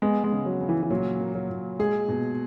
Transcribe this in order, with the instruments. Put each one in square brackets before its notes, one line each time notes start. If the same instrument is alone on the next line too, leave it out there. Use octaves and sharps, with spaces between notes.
[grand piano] G#3 [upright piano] B3
[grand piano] G#3
[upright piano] C#3
[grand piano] F#3
[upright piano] C#3
[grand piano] E3
E3
[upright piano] A#2 [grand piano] F#3
[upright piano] A#3
[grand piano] F#3
[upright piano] A#2
[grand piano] G#3 [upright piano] G#4
[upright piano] B2